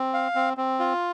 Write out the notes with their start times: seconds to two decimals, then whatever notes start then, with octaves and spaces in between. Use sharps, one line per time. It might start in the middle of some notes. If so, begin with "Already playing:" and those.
Already playing: C4
0.14 F5
0.35 C4
0.57 C4
0.80 F4